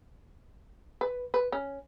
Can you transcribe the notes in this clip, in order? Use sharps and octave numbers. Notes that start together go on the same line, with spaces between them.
B4
B4
C#4